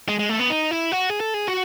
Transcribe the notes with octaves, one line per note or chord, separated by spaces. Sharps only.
G#3
G#3
A3
B3
D#4
E4
F#4
G#4
A4
G#4
F#4